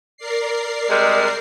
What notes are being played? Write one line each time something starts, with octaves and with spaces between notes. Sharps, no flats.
A#4 D5 C7
C3 G3 G#3